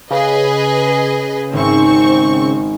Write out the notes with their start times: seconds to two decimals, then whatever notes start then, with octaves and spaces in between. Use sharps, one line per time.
0.11 C#3 G#4 B4 D#5
1.53 G#1 C4 C#6